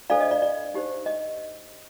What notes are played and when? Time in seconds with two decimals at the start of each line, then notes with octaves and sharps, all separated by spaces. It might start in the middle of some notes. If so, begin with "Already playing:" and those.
0.10 D4 A4 C5 D5 F5
0.21 D#5
0.31 D5
0.42 D5
0.74 D#4 G4 C5
1.06 D#5